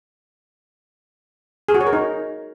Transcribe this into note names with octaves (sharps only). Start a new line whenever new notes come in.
G#4
F#4
C#5
A#4
D#4